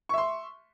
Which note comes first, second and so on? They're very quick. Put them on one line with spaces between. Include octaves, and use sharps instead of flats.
C#6 E5 C6